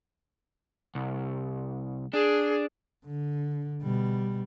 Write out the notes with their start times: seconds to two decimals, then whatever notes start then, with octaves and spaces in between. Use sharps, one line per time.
0.95 C2
2.14 D4 G#4
3.05 D3
3.82 B2 G3